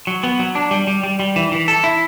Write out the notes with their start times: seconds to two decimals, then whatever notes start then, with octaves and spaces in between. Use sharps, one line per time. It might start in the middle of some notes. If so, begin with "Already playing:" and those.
0.07 F#3
0.23 B3
0.39 F#3
0.55 D4
0.71 G3
0.87 G3
1.03 G3
1.20 G3
1.36 E3
1.52 E3
1.68 A4
1.84 E4